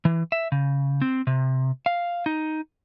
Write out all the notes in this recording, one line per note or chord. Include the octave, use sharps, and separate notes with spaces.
E3
E5
C#3
C4
C3
F5
D#4